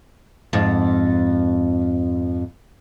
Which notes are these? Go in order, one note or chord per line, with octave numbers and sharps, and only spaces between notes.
F2 G#2